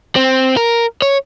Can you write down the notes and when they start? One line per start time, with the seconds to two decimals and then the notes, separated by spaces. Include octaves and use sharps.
0.16 C4
0.57 A#4
1.02 C#5